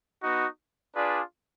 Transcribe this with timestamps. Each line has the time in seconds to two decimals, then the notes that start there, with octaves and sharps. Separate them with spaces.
0.20 B3 D#4 F#4
0.95 D4 F4 G#4 B4 D5